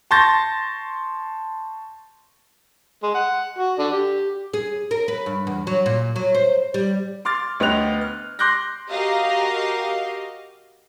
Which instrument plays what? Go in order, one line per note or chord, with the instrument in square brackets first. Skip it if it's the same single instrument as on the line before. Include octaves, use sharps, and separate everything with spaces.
[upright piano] A5 C6 C#6 G6 A6 A#6
[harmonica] G#3
F#5
F#4
D3 D5
G4
[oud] G#4
A#4
B4
G2
E2
F#3
A#2
F#3
C5
G3
[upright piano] C6 D6 F6 A6
D2 B3 D#5 G5 F#6 F7
F6
C6 D6 F#6 G6 A#6
[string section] F#4 G4 A#4 D#5 F5